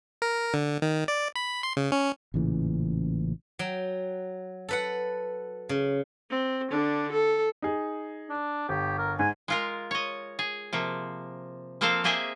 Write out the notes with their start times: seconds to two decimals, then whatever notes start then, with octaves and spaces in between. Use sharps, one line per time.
0.22 A#4
0.54 D3
0.82 D#3
1.08 D5
1.36 B5
1.63 C6
1.77 C#3
1.92 C#4
2.34 A1 A#2 C#3 E3
3.59 F#3 G5
4.69 A4 B4 F#5
5.69 C#3
6.30 C4
6.71 D3 D4
7.12 A4
7.62 D#4 G#4
8.30 D4
8.69 G1 G4
8.98 A#4
9.19 G#2 G#5
9.48 G#3 F4 A#4
9.91 C#5 D#5
10.39 G#4
10.73 C3 F3 A#3
11.81 F3 A#3 C4 A4 C5 F5
12.04 A#3 G4 G#4 D#5 E5 G#5